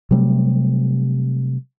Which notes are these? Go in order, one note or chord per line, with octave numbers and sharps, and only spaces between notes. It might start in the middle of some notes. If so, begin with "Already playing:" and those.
C3 F#3 G3 A3